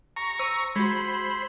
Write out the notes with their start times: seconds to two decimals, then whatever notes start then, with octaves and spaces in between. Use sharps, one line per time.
0.16 A#5 C#6
0.39 C5 E6 D#7
0.76 G#3 F#4 C5 B5 G#6